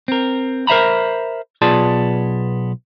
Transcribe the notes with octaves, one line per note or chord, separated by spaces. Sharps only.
C4 A#4
A#4 C5 E5 A#5 B5
B1 B3 F4 G#4 D5 A5